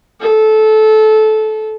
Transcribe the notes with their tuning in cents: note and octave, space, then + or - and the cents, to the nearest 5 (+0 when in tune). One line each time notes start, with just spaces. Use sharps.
A4 -20